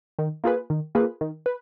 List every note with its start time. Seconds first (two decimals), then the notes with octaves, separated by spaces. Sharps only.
0.19 D#3
0.44 A#3 F4 G#4 B4
0.70 D#3
0.95 A#3 F4 G#4 B4
1.21 D#3
1.46 B4